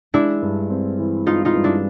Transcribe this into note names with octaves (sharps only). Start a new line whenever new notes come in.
G#3 D4 E4
G2
C4
E3
G#3 D#4 F4
D#4 F4
G2
D4 E4